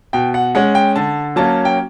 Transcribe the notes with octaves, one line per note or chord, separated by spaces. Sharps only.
B2 G5
F#5
G#3 C#4 F#5
G5
D3 A5
F#3 A#3 C#4 A5
G5